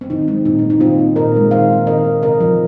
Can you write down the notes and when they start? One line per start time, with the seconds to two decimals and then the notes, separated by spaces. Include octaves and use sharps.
0.01 C4
0.10 D#3 D#4
0.28 G#3 C4
0.45 A#2 D#4
0.59 A#3 C4
0.70 D#4
0.80 D#3 C4 F4
0.99 C4
1.16 A#2 A#4 D#5
1.34 G#3 C4
1.51 D#3 C5 F5
1.69 G#3 C4
1.87 D#3 A#4 D#5
2.05 C4
2.22 C3 A#4 D#5
2.40 F3 C4